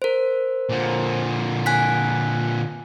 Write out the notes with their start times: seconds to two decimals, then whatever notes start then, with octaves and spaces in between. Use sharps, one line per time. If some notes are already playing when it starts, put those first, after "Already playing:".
0.02 A#4 C5
0.69 A#2 D3
1.66 G#5 F#6 B6